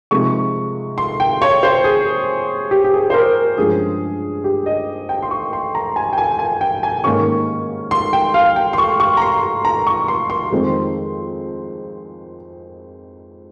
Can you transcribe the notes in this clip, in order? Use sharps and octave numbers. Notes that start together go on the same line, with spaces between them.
C3 F3 G#3 D#4 C#6
C6
G5
C#5
C5
G#4
G4
G4
G#4
C5
A#4
G2 F3 G#3 C#4 G#4
G4
D#5
G5
C6
C#6
C6
A#5
G#5
G5
G#5
G#5
G5
G#5
G#2 D#3 A#3 C#4 C#6
C6
G5
F5
G5
C6
C#6
C#6
A#5
C6
A#5
C#6
C6
C6
F2 D#3 G#3 C4